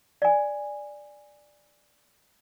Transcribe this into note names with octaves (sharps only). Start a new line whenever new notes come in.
D5 G#5